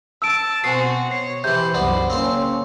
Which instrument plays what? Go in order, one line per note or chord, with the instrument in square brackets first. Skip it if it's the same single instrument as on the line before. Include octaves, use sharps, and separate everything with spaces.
[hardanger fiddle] A5 [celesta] E6 D7
[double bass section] B2 [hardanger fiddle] C4 F#4 [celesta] G#5 C7 [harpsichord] D#6
[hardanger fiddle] C#5 [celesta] C7
[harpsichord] C3 E3 [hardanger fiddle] C5 [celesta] G6
[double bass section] C2 F#2 F#3 [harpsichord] B3 D4
[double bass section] C#3 A#3 C#4 [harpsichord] C4 F5 C6